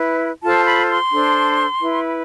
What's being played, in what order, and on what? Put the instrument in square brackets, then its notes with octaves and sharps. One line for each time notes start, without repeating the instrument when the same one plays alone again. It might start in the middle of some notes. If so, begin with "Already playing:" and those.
Already playing: [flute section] E4 B4
F4 A4 C5 A5
B5
C6
D4 A4 C5
E4 B4